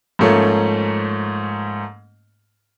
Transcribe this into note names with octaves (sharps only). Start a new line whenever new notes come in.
G#2 F3 A3 A#3 C#4